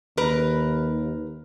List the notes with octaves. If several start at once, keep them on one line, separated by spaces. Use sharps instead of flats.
D#2 A#4 B4